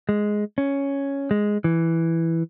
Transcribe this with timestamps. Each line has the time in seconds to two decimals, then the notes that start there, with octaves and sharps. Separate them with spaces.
0.09 G#3
0.58 C#4
1.31 G#3
1.64 E3